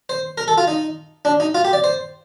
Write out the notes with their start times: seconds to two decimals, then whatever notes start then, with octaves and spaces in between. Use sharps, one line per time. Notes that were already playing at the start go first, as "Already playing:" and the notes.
0.09 C5
0.38 A#4
0.48 A4
0.58 F4
0.68 D#4
1.25 D4
1.40 D#4
1.55 F4
1.65 G4
1.73 D5
1.84 C5